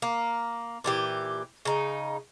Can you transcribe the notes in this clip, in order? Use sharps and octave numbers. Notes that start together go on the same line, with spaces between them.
A#3
A#2 E3 G4
C#3 D#4